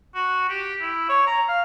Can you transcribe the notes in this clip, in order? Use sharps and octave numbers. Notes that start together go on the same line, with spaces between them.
F#4
G4
E4
C#5
A#5
F5